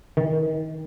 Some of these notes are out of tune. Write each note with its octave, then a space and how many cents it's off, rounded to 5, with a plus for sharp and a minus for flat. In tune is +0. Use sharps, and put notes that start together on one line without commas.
D#3 +25